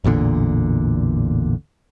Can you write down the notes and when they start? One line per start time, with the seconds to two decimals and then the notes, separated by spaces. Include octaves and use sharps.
0.04 A1 E2 A#2 D3